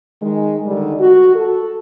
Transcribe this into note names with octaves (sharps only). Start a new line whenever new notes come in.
D#3 G#3
D3 D#3 G3
F#4
A4